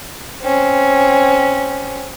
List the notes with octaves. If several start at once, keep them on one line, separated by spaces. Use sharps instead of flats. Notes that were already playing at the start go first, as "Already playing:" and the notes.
C4 C#4